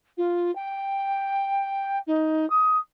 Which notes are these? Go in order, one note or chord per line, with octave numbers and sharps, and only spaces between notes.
F4
G5
D#4
D#6